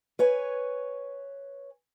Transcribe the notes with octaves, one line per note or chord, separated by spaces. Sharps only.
B4 C#5 G#5